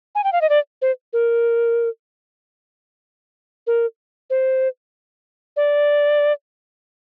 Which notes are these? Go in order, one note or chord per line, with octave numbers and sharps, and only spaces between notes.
G#5
G5
F5
D#5
D5
C5
A#4
A#4
C5
D5